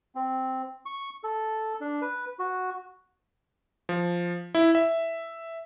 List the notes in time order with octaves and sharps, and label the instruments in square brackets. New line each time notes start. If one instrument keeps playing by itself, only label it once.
[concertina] C4
C#6
A4
D4
B4
F#4
[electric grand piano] F3
E4
E5